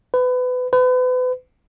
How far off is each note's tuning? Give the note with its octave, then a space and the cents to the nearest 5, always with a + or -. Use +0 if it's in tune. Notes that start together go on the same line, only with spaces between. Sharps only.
B4 +25
B4 +35